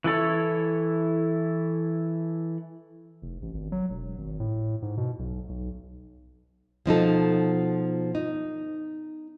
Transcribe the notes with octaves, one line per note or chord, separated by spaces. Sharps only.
E3 E4 A4 C#5
F1
A1
G#1
F#3
E1
G#1
A2
G#2
B2
B1
B1
B2 F3 D#4 A4
D#4